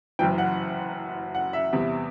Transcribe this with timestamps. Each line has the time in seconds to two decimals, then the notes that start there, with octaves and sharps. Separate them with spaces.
0.19 F#1 F#2 E3 G5
0.38 F#5
1.35 F#5
1.53 E5
1.73 E2 C3 G3 B3